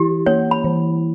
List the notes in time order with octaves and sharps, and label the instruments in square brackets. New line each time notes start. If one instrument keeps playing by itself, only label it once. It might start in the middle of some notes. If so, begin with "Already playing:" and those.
Already playing: [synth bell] E3 E4 [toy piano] G4
[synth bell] A#3 [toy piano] C#5
[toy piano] B5
[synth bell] E3